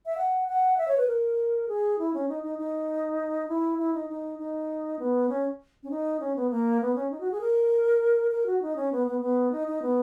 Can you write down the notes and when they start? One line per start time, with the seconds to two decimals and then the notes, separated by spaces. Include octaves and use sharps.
0.06 E5
0.17 F#5
0.48 F#5
0.78 E5
0.88 C#5
0.97 B4
1.07 A#4
1.68 G#4
1.99 E4
2.14 C#4
2.29 D#4
2.43 D#4
2.59 D#4
3.48 E4
3.79 E4
3.94 D#4
4.10 D#4
4.39 D#4
4.99 B3
5.29 C#4
5.83 C#4
5.90 D#4
6.20 C#4
6.36 B3
6.50 A#3
6.81 B3
6.95 C#4
7.11 D#4
7.20 F#4
7.31 G#4
7.41 A#4
8.31 A#4
8.46 F#4
8.62 D#4
8.76 C#4
8.92 B3
9.07 B3
9.21 B3
9.52 D#4
9.68 D#4
9.82 B3